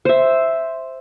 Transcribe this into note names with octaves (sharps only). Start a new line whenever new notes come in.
C5 E5